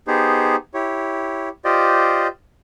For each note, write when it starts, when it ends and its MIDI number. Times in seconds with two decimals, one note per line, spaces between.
0.07 0.56 59
0.07 0.56 63
0.07 0.56 67
0.07 0.56 68
0.07 0.56 72
0.74 1.49 64
0.74 1.49 67
0.74 1.49 73
1.65 2.27 65
1.65 2.27 67
1.65 2.27 72
1.65 2.27 74
1.65 2.27 75